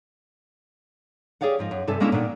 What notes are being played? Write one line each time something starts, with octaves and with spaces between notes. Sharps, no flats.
G4 G#4 C#5 D5 F5 F#5
G#2 F3 D#5
F#2
G2 C3 A4 E5 G#5
G#3 A#3 C#4 D4 E4 E5
A#2 D#3 D4 F#5